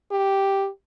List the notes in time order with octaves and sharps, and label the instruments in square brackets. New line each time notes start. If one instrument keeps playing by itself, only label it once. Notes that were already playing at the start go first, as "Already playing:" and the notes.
[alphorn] G4